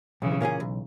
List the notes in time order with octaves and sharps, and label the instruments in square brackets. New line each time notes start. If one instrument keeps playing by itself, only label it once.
[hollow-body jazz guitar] B1 [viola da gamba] C#3 E3
[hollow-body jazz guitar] A#2 A#3 C#4 G#4
B1